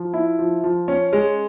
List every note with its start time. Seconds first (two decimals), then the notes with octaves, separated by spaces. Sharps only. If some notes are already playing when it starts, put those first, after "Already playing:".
Already playing: F3
0.13 E4
0.39 F3
0.64 F3
0.88 C#4
1.13 G#3